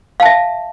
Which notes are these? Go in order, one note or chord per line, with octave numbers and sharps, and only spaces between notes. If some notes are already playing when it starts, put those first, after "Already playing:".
E5 F5 A5